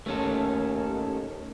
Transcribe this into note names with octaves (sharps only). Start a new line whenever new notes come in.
D#2 A3 C#4 A4